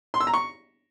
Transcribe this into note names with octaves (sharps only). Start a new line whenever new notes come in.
C6
E6
A#5
C#6